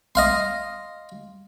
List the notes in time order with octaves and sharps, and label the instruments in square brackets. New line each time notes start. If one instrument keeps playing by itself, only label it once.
[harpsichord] D#5 F5 C6